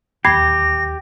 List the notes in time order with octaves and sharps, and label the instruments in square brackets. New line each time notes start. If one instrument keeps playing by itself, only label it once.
[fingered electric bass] D1 D#2 [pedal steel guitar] G4 [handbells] B5 G#6 C7 [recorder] A#6